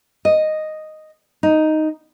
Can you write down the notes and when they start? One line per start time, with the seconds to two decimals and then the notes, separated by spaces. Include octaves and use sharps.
0.25 D#5
1.43 D#4